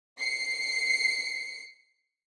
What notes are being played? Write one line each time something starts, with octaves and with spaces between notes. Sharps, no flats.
C7 C#7